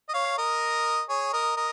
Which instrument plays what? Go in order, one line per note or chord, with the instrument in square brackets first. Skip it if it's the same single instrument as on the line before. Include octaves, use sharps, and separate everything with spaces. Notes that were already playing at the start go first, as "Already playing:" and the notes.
[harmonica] D#5
C#5 F5
A#4 D#5
G#4 C#5
A#4 D#5
A#4 D#5